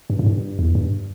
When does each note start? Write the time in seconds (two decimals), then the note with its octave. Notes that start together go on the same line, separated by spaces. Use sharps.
0.10 G2
0.19 A2
0.26 G2
0.59 E2
0.75 G2